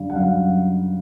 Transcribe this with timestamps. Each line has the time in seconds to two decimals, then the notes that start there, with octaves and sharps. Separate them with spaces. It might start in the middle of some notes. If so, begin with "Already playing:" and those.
Already playing: F#2 D3 G3 F5
0.10 F#5
0.16 F#2 F5